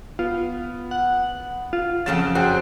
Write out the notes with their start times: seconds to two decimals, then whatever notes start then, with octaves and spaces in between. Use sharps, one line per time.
0.19 B3 F4
0.91 F#5
1.73 F4
2.06 F2 C#3 F#3 A6 E7
2.35 F#2 C4 F#4 G#4 G5